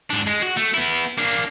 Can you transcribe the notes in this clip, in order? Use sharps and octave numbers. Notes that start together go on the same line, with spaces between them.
G#2 D4
G#3
F#4
A3
B3 E4
A#3 D4